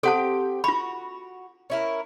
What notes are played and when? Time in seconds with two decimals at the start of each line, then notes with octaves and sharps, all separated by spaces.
0.03 C4 G4 A4 F#5 G5 A5
0.64 F4 F#4 B5
1.70 C#4 E4 A#4